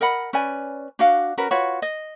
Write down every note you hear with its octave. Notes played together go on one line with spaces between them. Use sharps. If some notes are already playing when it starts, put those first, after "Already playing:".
A#4 D#5 F#5 B5
C#4 B4 D5 G#5
D4 F#4 F5
C#4 F#4 A#4 B4
F4 F#4 B4 C#5
D#5